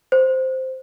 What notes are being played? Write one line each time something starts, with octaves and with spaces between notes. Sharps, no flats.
C5